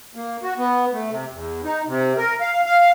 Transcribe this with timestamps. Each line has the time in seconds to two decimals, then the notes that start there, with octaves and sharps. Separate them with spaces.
0.15 A#3
0.43 F#4
0.58 B3
0.93 A3
1.11 C3
1.32 E2
1.64 D#4
1.87 C3
2.17 A#4
2.41 F5
2.66 F5